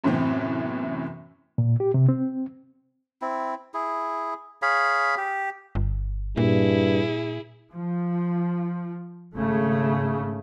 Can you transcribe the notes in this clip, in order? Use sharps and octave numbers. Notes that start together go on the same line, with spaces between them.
F#2 A2 C3 E3 B3 C4
A#2
G4
C3
C4
C4 E4
E4 G#4
G#4 C#5 F5 B5
G4
G1
G2 A#2 E4 G#4
F3
G#1 C#3 A3